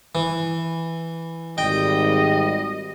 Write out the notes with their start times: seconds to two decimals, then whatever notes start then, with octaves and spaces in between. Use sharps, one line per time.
0.15 E3
1.58 G#1 G3 D#5 G5